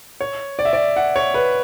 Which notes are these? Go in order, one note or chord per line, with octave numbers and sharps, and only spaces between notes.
C#5
D5
E5
D5
F#5
C#5
B4